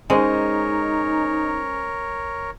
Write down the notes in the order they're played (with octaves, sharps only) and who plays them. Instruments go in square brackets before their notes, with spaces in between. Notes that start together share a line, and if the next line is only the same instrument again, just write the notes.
[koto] G#3 [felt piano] C#4 C5 D#5 [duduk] D#4 [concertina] A#4 C#5